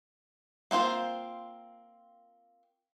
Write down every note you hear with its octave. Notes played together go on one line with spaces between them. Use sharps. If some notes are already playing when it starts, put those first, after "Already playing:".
A#3 C4 F4 C5